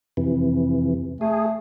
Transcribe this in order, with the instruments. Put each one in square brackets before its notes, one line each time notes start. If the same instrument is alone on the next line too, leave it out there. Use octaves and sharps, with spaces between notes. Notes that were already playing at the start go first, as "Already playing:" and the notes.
[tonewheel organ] F2 C3 E3
[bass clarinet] A3 [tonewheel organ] G#4